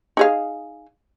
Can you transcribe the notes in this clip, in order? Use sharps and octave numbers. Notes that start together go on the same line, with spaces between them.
D#4 G#4 F5